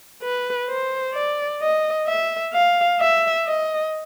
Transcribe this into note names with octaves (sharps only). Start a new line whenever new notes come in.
B4
C5
D5
D#5
E5
F5
E5
D#5